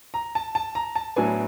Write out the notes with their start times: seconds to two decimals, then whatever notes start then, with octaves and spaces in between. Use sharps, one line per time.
0.14 A#5
0.35 A5
0.55 A5
0.75 A#5
0.95 A5
1.16 A2 F#3 B3 D4 G#5